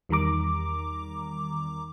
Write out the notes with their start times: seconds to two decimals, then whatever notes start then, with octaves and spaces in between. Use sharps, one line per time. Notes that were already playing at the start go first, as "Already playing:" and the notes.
0.09 E2 D#3 G3 A#5 D6